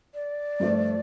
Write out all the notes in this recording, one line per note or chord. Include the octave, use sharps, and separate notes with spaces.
D5
G2 F3 A3